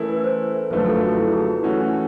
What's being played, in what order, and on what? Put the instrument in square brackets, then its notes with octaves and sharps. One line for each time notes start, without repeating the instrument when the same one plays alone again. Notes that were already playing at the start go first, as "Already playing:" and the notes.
Already playing: [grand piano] E3 A3 C#4 E4 [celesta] A4 A#4
[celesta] B4
C5
[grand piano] F#1 F#2 D3 F3 A3 [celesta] B4
[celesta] A4
F#4
E4
G#4
[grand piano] E3 A3 C#4 F#4